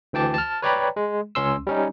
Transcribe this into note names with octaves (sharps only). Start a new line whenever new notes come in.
D2 E3 G5 A5 D6
A5 F6
B4 C#5 D5 G5 A#5 B5
G#3
C#2 C#4 C6 E6
G3 C#4 D#4